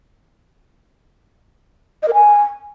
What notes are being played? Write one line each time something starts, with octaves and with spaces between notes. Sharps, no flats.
D#5
A#4
G#5